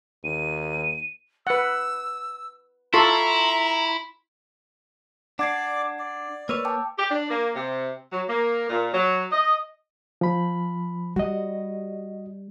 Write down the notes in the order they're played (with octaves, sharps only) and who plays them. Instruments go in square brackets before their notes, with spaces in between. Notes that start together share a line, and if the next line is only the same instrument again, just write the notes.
[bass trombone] D#2 [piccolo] D#7
[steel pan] B4 F#5 [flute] E6
[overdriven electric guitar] E4 [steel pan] F4 A4 [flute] A#5 [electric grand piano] C6 C#6
[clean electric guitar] D4 [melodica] D5 D6 [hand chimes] F#5 G#6 C7
[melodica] D5
[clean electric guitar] A#3 B4 C#5 [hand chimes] E6
[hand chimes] G5 A5 D6
[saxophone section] G4
D4
A#3
C3
F#3
A#3
A#2
F#3
D#5
[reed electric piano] F3 B5
[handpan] G3 [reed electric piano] F#4 D#5